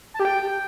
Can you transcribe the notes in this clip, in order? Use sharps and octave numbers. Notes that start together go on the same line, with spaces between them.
A5
G4
G5